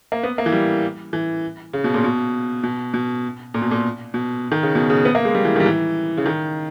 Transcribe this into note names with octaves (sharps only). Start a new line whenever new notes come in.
A#3
B3
A#3
E3
G3
E3
C#3
B2
A#2
B2
B2
B2
A#2
B2
A#2
B2
D#3
C#3
B2
C#3
B3
A#3
G#3
G3
E3
D#3
G3
E3
C#3
D#3